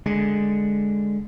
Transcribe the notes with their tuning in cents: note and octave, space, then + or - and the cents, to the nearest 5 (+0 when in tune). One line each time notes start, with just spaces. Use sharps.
D3 +0 G#3 +0